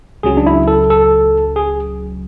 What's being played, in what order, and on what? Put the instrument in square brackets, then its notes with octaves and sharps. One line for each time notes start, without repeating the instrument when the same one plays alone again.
[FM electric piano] C#2 C#3 F#3 [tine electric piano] G#4
[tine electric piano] D4
E4
A4
A4
G#4